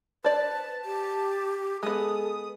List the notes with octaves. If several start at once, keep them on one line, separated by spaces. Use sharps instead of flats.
B4 C5 D5 A5
G4
G#3 B3 G#4 A4 D#6